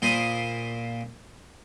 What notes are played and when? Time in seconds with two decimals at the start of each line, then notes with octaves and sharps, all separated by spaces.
0.02 A#2 C5 B5 D#6